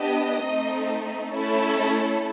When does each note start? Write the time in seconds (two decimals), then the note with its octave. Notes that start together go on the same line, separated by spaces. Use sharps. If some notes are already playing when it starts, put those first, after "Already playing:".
Already playing: B3 D4 G4 D#5
0.42 A3 C4 D#4
1.32 A3 C#4 E4 A4